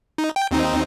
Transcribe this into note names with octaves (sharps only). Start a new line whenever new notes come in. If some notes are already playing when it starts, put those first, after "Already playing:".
D#4
G5
D#2 C4 D#4